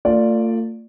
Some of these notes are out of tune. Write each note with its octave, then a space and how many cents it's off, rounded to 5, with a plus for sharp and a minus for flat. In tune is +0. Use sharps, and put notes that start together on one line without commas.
A3 +45 F4 +0 D5 +0